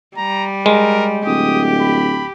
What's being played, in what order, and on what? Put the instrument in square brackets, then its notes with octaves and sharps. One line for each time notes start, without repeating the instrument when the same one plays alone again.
[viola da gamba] G3 [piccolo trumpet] A#5
[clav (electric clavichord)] G#3 [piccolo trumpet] A#4
[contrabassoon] D1 [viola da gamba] G4 [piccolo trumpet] D#6
[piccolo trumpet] B5